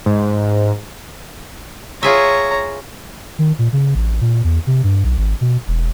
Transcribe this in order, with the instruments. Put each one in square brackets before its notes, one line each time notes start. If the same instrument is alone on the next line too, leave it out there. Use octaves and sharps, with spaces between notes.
[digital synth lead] G#2
[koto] F4 G#4 E5 [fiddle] C#5 A#5
[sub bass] D#3
A#2
C#3
A1
A#2
E2
C3
G2
B1
G#1
B2
E1